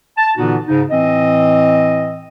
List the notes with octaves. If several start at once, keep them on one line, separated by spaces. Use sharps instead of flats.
A5
A#2 D3 E3 B3 D#4 F#4
G#2 C#3 D#4
A2 E3 C4 D#5